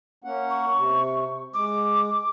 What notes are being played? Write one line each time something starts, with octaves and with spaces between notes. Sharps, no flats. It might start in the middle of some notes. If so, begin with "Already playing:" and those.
A#3 C#4 F#5
C#6
C3
G#3 D6